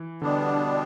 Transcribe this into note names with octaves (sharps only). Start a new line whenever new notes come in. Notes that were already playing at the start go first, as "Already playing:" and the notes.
Already playing: E3
B2 D3 G3 B3 D4